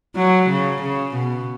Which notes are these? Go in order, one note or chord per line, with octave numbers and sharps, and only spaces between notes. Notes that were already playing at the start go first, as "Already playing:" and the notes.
F#3
C#3
C#3
B2